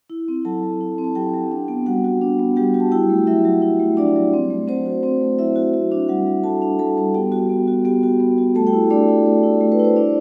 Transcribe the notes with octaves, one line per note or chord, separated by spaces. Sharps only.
E4
C4
F#3 A4 A5
F#3
E4
C4
A5
F#3 G4 G5
F#3
D4
B3
G3 F#4 F#5
F#4
D4
B3
G3 G4 G5
F#4
A5
E4 G4 G5
A3
F#3 E4 E5
F#3
E4
A3
F#3 D4 D5
F#3
C4
A3
F#3 C4 C5
F#4
C4
A3
F#3 E4 E5
F#4
F#4
D4
G3 F#4 F#5
G3
F#4 A4 A5
D4
G3 A4 A5
G3
B3 G4 G5
F#4
B3
F#4
B3 G4 G5
F#4
B3
F#4
A3 A4 A5
G4 G5
E4
A3 D4 D5
E4
A3
E4
A3
B4
E4 C5
D4 E4 D5